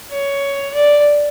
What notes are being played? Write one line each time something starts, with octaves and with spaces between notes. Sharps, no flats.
C#5
D5